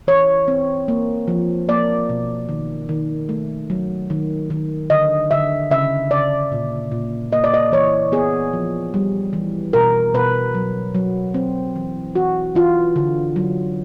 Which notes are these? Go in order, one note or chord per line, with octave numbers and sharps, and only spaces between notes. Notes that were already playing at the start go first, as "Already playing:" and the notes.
E3 C#5
C4
A#3
F3
A#3 D5
B2
D#3
D#3
A3
F#3
D#3
D#3
D3 D#5
D3 E5
C#3 E5
C#3 D5
A#2
A#2
A#3 D#5
D5
D#5
E3 C#5
B3 G#4
F3
G3
E3
B2 A#4
B2 B4
F#3
F#3
C4
E3
E3 F#4
E3 F4
D3
F#3